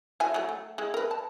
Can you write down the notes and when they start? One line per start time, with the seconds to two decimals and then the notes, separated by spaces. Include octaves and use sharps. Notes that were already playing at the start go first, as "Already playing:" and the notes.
0.20 E4 F#4 G#5
0.34 F#3 A3
0.49 A3
0.78 G#3 E4
0.94 A#4 B4
1.11 A5